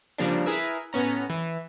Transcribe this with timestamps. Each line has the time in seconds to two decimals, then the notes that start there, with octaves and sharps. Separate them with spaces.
0.18 C#3 F3 G3 A#3 C4 D4
0.46 E4 G#4 A#4 B4 E5
0.93 A2 B3 C#4 A#5
1.30 E3